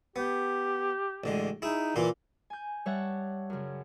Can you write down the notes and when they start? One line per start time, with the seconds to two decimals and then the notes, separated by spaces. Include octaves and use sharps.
0.16 B3 G4
1.24 A1 D3 G#3
1.62 D#4 E4 G#4
1.96 A#2 E3 A#3 F4
2.50 G#5 G6
2.86 G3 C#5 E5 F#5 A5
3.50 F#2 C#3